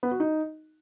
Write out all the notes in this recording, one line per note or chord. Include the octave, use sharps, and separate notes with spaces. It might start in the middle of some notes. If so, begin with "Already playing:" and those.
B3
F#4
D#4